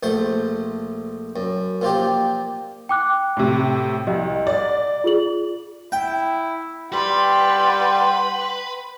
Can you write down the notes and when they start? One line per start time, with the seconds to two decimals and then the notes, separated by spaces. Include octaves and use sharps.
0.03 A#1 A3 C5 C6
1.36 F#2
1.81 A#2 F3 F4 G4
2.89 G5 D6 F#6
3.37 A2 C3
4.07 C2 D#5
4.47 D5
5.04 F4 G#4 F#7
5.92 E4 G5
6.93 G3 B4 F#5 G5 C6